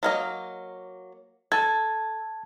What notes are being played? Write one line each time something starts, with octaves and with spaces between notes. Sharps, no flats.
F#3 A#3 D#5
A4 A5 G#6